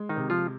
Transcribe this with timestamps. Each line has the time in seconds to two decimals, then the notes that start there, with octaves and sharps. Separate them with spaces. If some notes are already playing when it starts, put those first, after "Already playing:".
Already playing: G#3
0.09 D#3 D#4
0.16 C3
0.30 F3 F4